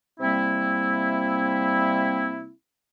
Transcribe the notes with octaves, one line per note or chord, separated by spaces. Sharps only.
C3 G3 A#3 C4 E4